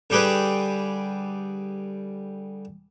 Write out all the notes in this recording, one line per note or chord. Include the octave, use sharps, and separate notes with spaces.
D3 G3 G4 G#4 B4